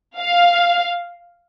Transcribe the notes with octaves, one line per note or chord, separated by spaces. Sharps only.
F5